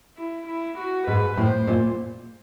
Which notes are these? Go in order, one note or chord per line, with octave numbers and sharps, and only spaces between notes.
E4
E4
F#4
G#2 B4
A2 C5
A#2